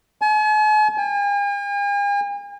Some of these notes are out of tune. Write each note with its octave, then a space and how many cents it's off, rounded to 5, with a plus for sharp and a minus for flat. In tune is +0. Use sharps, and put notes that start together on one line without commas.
G#5 +45
G#5 -45